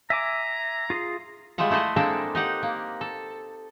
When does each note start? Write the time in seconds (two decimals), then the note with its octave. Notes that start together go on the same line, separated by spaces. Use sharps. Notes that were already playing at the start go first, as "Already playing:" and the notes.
0.10 E5 G#5 A#5 D6
0.90 F4 G#4 C6
1.58 G3 G#3 F4 E5 F#5
1.70 A3 E4 A4 C5 D#5
1.96 G#3 A#3 C4 D4 A4
2.35 D#4 G4 F#5
2.63 A#3
3.01 A4